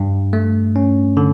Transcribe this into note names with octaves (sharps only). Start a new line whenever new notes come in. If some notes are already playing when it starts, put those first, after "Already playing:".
Already playing: G2
A3
C#4
D3